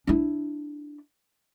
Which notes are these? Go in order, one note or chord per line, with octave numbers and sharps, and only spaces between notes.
D4 E4